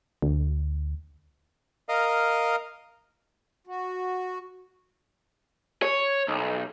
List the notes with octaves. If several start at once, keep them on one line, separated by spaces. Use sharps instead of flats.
D2
A#4 D#5 F5
F#4
C#5
B1